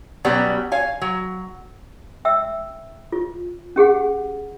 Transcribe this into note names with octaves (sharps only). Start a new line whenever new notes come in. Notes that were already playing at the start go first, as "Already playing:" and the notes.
B2 F#3 G3 B3 C#4
C#5 F5 G#5
F#3
E5 G5 E6
F4
C#4 G4 G#4 F#5